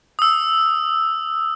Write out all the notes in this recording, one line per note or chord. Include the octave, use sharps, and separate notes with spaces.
D#6 E6